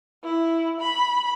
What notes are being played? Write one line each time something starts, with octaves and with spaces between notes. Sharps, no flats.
E4
B5